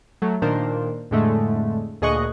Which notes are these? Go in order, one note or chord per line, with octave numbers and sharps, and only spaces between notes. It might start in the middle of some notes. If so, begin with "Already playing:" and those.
F#3 A3
A#2 D#3 D4 A#4 C5
F2 A2 D3 G#3 A3
D2 A#2 G#4 D#5 C#6 F#6